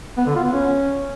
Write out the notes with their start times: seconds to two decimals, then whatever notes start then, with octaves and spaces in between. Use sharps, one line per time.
0.17 B3
0.26 D3
0.35 F4
0.44 B3
0.52 C#4